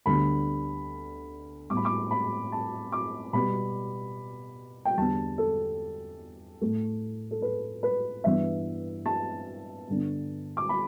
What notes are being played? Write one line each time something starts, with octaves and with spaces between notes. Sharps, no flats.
D2 D3 G3 B3 B5
A2 G3 B3 D6
B5
D6
B5
A5
D6
B2 G3 B3 B5
G5
E2 D3 G3 B3 A5
A4
A2 A3
A4
B4
B4
G2 E3 B3 E5
A5
G2 D3 B3
D6
B5